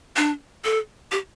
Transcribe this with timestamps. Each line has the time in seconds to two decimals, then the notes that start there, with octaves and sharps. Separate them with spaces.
0.16 D4
0.64 A4
1.11 G4